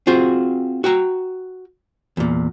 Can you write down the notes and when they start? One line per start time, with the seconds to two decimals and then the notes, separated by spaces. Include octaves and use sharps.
0.07 C4 F4 F#4 G#4
0.84 F#4 G5 A#5
2.17 E2 A#2